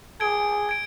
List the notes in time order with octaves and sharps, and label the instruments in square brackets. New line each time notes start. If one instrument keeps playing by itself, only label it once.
[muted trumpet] G#4 [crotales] G#6 D7 G7
[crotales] G#6 D7